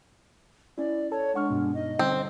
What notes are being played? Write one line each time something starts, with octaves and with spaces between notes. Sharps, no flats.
C#4 E4 D5
A4 C#5 A5
G#3 D4 F#5 C#6 F6
G2 B2 B3
D#4 D#5
D3 G3 C4 C#4